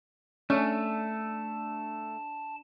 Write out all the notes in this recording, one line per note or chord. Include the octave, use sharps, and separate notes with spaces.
A3 C#4 D4 A5